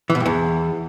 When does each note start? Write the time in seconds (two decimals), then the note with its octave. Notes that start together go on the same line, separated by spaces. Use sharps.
0.10 E3
0.15 B2
0.20 G2
0.26 E2